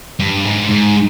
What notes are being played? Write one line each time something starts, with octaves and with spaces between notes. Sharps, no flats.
G2
G#2
G#2